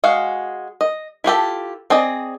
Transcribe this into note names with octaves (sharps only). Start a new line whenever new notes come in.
G#3 F#4 F5
D#5
E4 F4 G4 A4
C4 G#4 D5 D#5